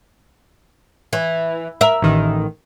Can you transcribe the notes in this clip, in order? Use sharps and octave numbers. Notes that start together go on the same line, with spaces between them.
E3
A#4 E5
A1 D#3